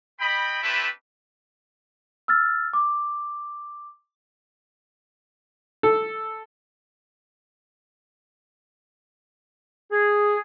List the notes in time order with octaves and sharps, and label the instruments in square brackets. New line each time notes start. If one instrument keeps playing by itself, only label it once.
[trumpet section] A3 D#5 G5 B5
A3 C4 D4 E4 G4 B4
[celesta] E6 F6 A6
D6
[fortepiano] A4
[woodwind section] G#4